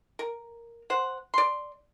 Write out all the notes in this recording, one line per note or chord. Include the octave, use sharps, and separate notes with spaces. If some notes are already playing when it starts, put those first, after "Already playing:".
A#4
C5 F#5
D5 C6